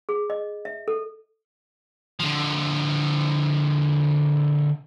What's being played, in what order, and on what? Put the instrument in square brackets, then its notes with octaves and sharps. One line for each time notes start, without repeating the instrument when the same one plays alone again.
[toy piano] G#4
D#5
E5
A4
[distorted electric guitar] D3 F3